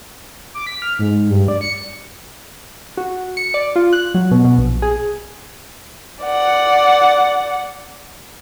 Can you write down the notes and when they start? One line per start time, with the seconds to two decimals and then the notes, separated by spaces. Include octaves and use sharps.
0.54 D6
0.67 B6
0.82 F6
0.99 G#2
1.30 G2
1.48 D5
1.61 C#7
2.97 F#4
3.37 C#7
3.54 D5
3.76 F4
3.93 F#6
4.14 F#3
4.31 B2
4.45 B2
4.58 A#1
4.82 G#4
6.23 D5 F#5